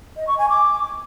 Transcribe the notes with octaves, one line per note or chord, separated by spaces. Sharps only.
D#5
C#6
G#5
D6